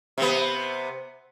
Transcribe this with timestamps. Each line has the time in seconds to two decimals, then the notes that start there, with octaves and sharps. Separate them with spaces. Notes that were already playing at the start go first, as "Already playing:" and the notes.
0.18 C3 B3